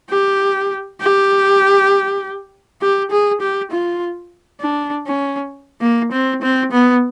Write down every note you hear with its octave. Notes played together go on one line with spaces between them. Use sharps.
G4
G4
G4
G#4
G4
F4
D4
C#4
A#3
C4
C4
B3